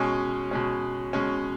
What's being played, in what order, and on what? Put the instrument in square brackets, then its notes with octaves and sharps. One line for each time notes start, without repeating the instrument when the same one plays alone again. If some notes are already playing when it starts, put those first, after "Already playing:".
Already playing: [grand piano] B2 G#3 C#4
B2 G#3 C#4
B2 G#3 C#4